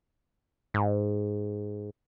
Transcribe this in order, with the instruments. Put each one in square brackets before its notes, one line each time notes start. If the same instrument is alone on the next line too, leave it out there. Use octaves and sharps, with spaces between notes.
[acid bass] G#2